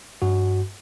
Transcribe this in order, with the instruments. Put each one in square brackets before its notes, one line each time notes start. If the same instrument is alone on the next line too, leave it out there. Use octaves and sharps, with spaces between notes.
[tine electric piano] G2 F#4